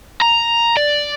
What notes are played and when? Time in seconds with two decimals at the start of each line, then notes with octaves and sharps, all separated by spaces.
0.22 A#5
0.77 D5